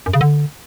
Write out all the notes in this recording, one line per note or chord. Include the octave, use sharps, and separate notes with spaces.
F#2
C#3
D3